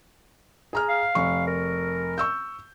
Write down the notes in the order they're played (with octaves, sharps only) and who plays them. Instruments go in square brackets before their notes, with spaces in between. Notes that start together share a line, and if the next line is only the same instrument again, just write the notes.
[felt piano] G#4 A#5 F6
[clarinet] F5
[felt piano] F1 C#6
[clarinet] A#4
[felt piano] C#6 E6 G6